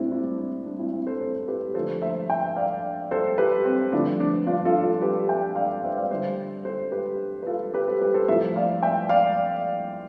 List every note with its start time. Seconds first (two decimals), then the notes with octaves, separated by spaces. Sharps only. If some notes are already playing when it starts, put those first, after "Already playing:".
Already playing: A2 G3 C4 D4 E4
0.11 C4 E4
0.38 D4
0.66 D4
0.79 C4 E4
0.93 C4 E4
1.07 A4 C5
1.21 A4 C5
1.48 G4 B4
1.74 D3 F3 A3 A4 C5
2.02 C5 E5
2.30 E5 G5
2.46 E5
2.56 D5 F5
3.11 A4 C5
3.38 G4 B4
3.65 C4
3.92 D3 F3 A3 D4
4.20 D4
4.47 D4 F4
4.65 F4 A4
4.83 F4 A4
5.02 G4 B4
5.29 E5 G5
5.56 D5 F5
5.84 C5 E5
5.97 D5 F5
6.10 D3 G3 C5 E5
6.65 A4 C5
6.91 G4 B4
7.43 B4
7.47 F4 A4
7.74 G4 B4
7.87 A4 C5
8.01 G4 B4
8.14 A4 C5
8.28 A2 F3 A3 C5 E5
8.56 D5 F5
8.83 E5 G5
9.09 D5 F5